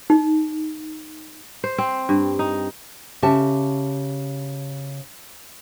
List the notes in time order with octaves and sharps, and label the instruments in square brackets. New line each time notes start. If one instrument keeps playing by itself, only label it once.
[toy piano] D#4
[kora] C5
C4
G2
D#4
[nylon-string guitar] C#3 G4 E5 A5